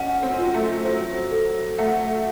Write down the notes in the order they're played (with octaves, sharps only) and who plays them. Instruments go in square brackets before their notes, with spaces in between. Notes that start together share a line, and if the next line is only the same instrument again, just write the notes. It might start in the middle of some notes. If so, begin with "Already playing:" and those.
Already playing: [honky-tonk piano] C#4 D#4 [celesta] F#5
[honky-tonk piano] C4
[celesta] F4
[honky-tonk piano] F#3
A3
[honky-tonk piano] F#3 [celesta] C5
[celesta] A4
[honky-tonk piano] A3 [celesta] F#5